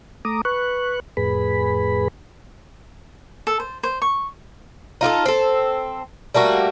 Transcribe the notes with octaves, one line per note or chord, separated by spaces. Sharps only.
A3 A#5 D6 D#6
B4 C#6 F#6
F2 A2 G#4 B4 B5
A4
C5
C5
C#6
D#4 F4 G4 A4
C4 A4
G3 A3 A#3 F#4